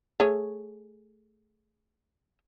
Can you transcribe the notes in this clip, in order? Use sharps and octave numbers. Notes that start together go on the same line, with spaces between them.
A3 G#4 C#5